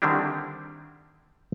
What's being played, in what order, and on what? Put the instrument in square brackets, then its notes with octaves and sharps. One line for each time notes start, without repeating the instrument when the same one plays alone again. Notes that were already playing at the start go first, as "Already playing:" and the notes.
[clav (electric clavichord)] D3 D#3 G3 C4 D4 E4